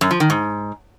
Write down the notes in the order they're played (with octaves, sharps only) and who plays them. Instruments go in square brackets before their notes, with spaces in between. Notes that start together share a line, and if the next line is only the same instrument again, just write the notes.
[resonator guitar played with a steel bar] F#2
F3
D#3
G#2